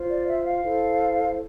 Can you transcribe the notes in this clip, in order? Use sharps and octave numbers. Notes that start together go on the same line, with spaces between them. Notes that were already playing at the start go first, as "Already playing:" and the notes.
Already playing: F4 C5
D5
E5
F5
E4 A4 C5